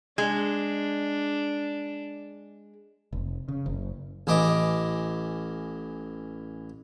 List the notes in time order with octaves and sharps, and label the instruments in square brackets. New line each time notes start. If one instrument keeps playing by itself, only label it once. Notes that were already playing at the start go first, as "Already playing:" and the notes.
[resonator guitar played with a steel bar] G#3 [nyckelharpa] D4
[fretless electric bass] F1
C#3
F#1
[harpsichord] A1 E3 D#5 D6